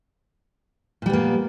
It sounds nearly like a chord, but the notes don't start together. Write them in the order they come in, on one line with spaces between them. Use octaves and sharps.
A#2 G3 B3 A#3